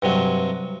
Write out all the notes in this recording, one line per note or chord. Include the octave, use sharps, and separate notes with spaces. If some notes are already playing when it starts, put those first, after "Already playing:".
G2 C3 F#3